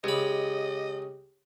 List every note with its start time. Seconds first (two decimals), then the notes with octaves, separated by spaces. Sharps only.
0.04 C#2 G4 G#4 D#5 B5